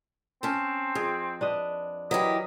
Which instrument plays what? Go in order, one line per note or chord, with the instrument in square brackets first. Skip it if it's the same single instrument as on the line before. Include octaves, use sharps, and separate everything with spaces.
[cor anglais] C4 [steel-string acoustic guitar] C#4 A5
[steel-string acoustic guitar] F2 [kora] G#4
[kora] D4 B4 D#5
[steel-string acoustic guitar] E3 E4 G4 [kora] F#3 A#4 [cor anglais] D#5